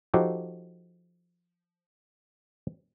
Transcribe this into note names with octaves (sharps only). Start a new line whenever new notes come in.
F3 D#4 F#4 G4 A4